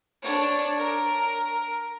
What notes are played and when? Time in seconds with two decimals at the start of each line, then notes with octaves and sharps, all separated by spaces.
0.22 D4 C#5
0.77 A#4